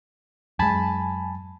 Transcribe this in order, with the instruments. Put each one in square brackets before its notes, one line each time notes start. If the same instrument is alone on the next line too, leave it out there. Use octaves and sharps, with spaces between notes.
[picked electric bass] F#2 G#3 [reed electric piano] G#5 A5 B5